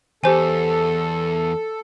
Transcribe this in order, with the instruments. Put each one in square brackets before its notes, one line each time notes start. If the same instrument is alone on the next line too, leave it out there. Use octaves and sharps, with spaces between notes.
[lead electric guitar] E2 [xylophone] G4 C5 G#5 [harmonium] A4